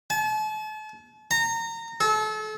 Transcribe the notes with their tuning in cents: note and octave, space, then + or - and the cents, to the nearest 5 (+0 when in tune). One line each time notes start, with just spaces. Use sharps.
A5 -40
A#5 -25
A4 -35